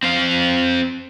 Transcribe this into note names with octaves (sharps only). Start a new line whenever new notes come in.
C4 F5